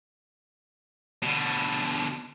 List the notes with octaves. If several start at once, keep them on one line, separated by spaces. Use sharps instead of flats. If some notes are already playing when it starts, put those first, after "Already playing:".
B2 D3